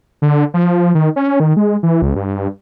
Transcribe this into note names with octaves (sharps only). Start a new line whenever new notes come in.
D3
F3
D#3
C#4
D#3
G#3
E3
C#2
G2